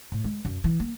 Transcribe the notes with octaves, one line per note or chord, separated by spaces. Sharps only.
A2
G#3
F#2
E3
A#3